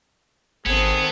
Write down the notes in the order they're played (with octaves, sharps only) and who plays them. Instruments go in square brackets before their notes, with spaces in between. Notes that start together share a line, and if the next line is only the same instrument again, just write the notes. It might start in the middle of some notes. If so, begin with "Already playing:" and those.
[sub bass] G#1 [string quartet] D#3 C4 A4 [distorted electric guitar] B3 [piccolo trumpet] G#4